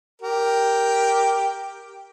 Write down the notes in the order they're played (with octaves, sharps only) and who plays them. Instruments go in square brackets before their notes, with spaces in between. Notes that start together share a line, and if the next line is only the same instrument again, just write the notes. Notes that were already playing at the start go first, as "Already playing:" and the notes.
[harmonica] G4 A#4